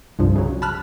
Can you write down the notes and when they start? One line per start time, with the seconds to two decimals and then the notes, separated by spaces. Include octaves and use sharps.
0.19 C2 G2 F3
0.36 C#3 F#3
0.62 A5 B5 F6 F#6